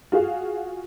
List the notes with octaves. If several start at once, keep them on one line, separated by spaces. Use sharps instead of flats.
F4 F#4 G#4 F5